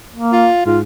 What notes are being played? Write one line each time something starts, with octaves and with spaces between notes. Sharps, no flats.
A#3
F4
G#2 F4